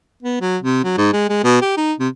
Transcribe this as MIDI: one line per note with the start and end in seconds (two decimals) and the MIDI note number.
0.23 0.38 59
0.41 0.58 54
0.63 0.82 48
0.84 0.94 54
0.98 1.10 44
1.13 1.24 56
1.29 1.41 56
1.44 1.59 47
1.62 1.75 67
1.77 1.93 63
1.99 2.08 48